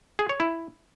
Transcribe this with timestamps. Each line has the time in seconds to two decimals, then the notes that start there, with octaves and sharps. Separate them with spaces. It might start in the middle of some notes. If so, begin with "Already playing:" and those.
0.19 G#4
0.29 C#5
0.40 E4